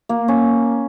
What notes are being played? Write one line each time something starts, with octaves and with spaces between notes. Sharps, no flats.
A#3
C#4